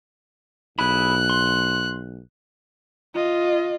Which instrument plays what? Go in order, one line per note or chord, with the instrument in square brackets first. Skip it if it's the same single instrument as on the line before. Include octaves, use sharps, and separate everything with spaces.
[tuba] B1 [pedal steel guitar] E4 G#4 B5 [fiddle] F#6
[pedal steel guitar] C6
[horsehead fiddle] F4 D#5